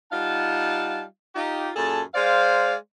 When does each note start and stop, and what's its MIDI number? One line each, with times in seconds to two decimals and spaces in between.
0.12 1.03 55
0.12 1.03 63
0.12 1.03 65
0.12 1.03 77
0.12 1.03 78
0.12 1.03 81
1.35 1.70 63
1.35 1.70 65
1.35 1.70 67
1.75 2.01 42
1.75 2.01 46
1.75 2.01 68
1.75 2.01 69
1.75 2.01 81
2.14 2.74 56
2.14 2.74 72
2.14 2.74 74
2.14 2.74 77